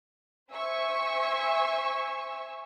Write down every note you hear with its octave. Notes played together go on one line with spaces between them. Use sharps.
C5 E5 G#5 C#6 E6